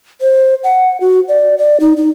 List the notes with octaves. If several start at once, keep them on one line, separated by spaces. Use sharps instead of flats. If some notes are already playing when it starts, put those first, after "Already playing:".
C5
F#5
F#4
D5
D5
D#4
D#4